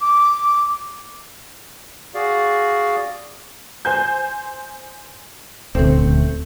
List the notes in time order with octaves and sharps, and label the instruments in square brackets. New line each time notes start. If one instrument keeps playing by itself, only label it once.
[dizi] D6
[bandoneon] F#4 G#4 D5 F5
[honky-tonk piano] C5 G#5 G6
[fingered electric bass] D#1 D2 [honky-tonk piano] A3 C4